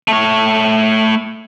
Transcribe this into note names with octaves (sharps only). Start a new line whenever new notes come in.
A3 C#5